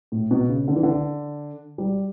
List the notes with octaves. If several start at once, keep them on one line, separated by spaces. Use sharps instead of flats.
A2
B2
C#3
D3
E3
D3
G3